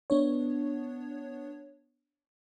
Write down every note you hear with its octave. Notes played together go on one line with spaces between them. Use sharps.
B3 D4 C#5